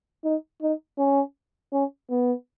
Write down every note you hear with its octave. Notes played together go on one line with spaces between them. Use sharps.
D#4
D#4
C#4
C#4
B3